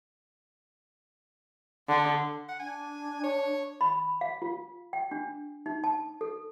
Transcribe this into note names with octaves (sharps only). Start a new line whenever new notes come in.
D3
F#5
D4 G#5
C#5
B5
F5
F4
G5
D4
D#4
A5
A4